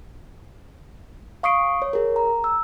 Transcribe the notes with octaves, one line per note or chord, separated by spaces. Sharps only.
F5 C#6 D#6 C7 D7
C#5
G#4 A#4
A#5
E6